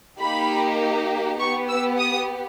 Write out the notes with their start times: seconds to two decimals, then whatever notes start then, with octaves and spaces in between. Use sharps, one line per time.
0.21 A#3 D#4 G4 B5
1.39 B3 G4 C#6
1.69 E6
1.98 D#6